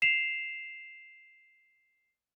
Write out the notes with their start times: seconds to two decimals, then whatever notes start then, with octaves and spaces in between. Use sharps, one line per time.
0.02 C7 E7 F7